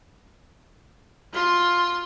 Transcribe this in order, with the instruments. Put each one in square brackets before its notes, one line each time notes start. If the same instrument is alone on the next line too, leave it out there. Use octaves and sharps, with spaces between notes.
[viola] F4 C6